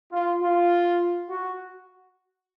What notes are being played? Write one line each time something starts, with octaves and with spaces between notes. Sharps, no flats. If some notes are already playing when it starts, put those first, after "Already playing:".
F4
F4
F#4